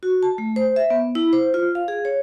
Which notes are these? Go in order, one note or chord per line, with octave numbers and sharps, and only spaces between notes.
F#4
A5
A3
C5
E5
B3
E4
C5
F4
F5
G#4
C#5